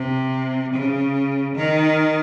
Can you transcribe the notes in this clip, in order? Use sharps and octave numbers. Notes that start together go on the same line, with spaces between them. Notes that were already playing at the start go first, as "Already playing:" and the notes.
Already playing: C3
C#3
D#3